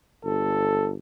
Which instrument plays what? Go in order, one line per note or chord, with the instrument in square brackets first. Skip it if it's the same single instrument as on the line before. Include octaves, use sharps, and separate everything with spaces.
[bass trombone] G1 [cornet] A4